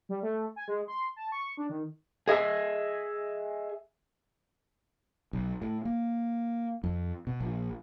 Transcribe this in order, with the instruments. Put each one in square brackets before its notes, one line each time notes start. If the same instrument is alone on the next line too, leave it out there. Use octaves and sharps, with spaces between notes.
[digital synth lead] G3
A3
G#5
G#3
C6
A5
C#6
D4
D#3
[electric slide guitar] G#4 D#5 E5 G#5
[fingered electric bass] B1
A2
A#3
F2
B2
A#1